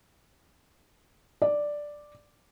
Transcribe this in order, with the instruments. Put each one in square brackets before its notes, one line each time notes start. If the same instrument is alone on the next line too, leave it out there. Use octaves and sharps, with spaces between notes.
[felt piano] D5